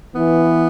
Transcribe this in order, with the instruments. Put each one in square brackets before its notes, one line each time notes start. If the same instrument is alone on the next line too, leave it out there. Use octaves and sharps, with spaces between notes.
[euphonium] E3 [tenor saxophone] B3